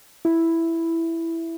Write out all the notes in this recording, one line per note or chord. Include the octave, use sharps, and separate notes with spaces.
E4